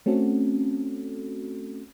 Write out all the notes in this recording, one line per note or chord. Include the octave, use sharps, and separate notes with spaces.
A3 C4 C#4 F#4 A4